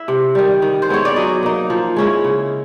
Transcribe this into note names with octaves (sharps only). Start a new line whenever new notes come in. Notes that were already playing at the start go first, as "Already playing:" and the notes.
Already playing: E4 E5
C3
D#3 G3
D#3
C5
G#3 B3 E4 C#5
D5
F#3 D#5
A#3 D#4
F3
G#3 C#4 E4
C#3